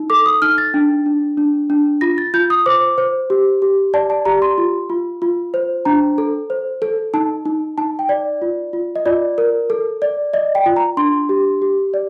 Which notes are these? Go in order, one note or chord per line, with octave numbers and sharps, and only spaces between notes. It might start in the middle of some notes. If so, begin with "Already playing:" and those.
Already playing: D#4
A4 D6
D#6
D#4 F6
A6
D4
D4
D4
D4
F4 A#6
A6
F4 G6
D#6
C5 D6
C5
G4
G4
D5 A5
A5
G4 A#5
C6
F4
F4
F4
C5
D4 A#5
A4
C5
A4
D#4 A5
D#4
D#4 A5
G5
D5
F4
F4
D#5
F4 D5
A#4
A4
D5
D5 D#5
G5
F4
A#5
D4 C6
G4
G4
D5